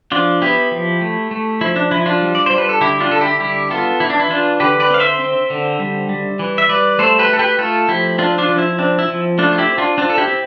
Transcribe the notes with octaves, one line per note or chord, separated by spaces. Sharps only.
F3 D4 F4
B3 E4 G4
F3
A3
A3
F3 E4
D4
F3 E4
D4 F4
G3
D5
G3 C5
B4
A4
D3 E4 G4
D4 F4
D3 A4
E4 G4
G3 E4 G4
B3 F4 A4
E3 E4
D4
E4
E3 D4 F4
D3 G4 B4
B4 D5
C4 F5
C5 E5
C4
D3
G3
G3
E3
E5
G3 B4 D5
A3 A4 C5
G4 B4
A3 A4
G4 B4
A3 F4 A4
F3 E4 G4
C4 D4 F4
D4 F4
F3
E4
C4 D4
E4
F3
A3 D4 F4
F4
E4 G4
C4
D4 F4
C4 D4 F4
A4
E4 G4
C4